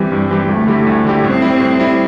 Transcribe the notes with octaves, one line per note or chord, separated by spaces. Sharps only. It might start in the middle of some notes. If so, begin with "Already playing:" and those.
Already playing: E3 G3 C4 G4
G2
E3 C4 G4
D2 A3
D3 G3 E4 G4
D2
D3 G3 E4 G4
A2 C4
G3 E4
A2
G3 E4